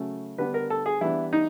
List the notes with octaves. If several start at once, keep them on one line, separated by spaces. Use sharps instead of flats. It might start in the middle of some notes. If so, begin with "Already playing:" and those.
Already playing: C#3 F#3 A3 C#4
D3 G3 B3 D4 B4
A#4
A4
G#4
E3 G3 B3 D4 E4
D#4